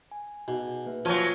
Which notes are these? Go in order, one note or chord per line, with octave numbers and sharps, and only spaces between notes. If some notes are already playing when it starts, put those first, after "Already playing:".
G#5
B2 D#4 G#4 G#5
A#3 B4 E5
F3 F#3 F4 C#5 G#5